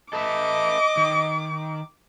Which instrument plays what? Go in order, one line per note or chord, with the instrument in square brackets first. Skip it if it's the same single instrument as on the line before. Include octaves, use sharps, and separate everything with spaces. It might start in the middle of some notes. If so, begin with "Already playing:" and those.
[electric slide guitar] A4 B4 E5 [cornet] D#5 [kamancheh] D6
[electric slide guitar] D#3